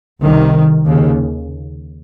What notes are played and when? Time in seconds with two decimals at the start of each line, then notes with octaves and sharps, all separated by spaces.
0.22 C2 C3 D#3
0.86 D#2 C#3